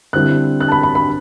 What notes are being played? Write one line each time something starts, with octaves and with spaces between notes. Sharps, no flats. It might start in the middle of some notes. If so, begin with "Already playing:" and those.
D3 G3 C4 E4 F#6
F#6
A5
B5
B5
B5